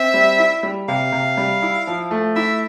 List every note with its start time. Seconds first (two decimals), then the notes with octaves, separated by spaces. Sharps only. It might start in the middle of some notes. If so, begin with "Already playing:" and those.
Already playing: C4 E5
0.14 G3
0.39 E4
0.63 G3
0.88 C3 F5
1.12 C3
1.37 G3
1.62 E4
1.87 F3
2.11 A3
2.36 E4 E5